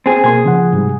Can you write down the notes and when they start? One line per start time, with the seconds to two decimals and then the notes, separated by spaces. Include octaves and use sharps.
0.06 C4 G#4
0.24 B2 A#3 G#4 C6
0.45 C#3 F3 F#5
0.73 G#2 C3 G3